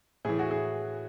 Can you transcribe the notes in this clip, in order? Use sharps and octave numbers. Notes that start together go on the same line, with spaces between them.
A2 E3 G#4
F#4
G#4